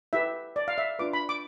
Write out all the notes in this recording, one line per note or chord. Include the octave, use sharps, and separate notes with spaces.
E4 G4 B4 E5
D5
F5
E5
D4 F4 B4 D6
B5
D6